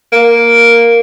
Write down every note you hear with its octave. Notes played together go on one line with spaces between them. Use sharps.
A#3